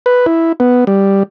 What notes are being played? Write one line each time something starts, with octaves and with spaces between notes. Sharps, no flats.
B4
E4
B3
G3